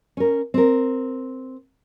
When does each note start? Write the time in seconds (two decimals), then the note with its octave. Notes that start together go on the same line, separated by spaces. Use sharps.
0.17 C#4 A#4
0.54 C4 A#4